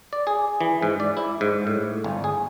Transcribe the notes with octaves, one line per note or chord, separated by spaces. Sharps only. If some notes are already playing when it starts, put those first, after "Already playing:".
D5
G#4
E3
G#2
D5
E4
G#2
A2
G1
G#4